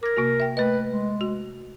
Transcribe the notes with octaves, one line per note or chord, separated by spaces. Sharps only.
A#4 D6 G#6
C3 A#3 F#4
E5 G5
A3 B4 D#5
G#3
F#4